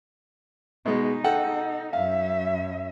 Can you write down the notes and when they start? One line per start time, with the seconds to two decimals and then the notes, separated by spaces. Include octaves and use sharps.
0.86 B2 G#3 D#4
1.24 A4 F#5 G5
1.93 F#2 E5 F5